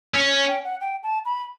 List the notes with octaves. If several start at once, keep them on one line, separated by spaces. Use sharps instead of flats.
C#4
G5
F#5
G5
A5
B5